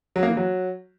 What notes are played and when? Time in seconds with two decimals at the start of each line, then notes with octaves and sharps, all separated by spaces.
0.16 F#3
0.23 A#3
0.30 E3
0.37 F#3